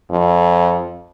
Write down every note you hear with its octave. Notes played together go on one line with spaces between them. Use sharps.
F2